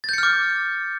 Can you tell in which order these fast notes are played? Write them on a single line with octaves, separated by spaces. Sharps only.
A6 G6 C#7 F6 D6